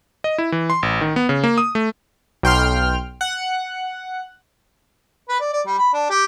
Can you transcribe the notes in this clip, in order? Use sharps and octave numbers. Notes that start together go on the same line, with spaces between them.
D#5
E4
E3
C6
A1
D#3
B3
C#3
A#3
D#6
A3
B1 G5 C6 F6
F#5
B4
D5
D5
G3
B5
D4
G4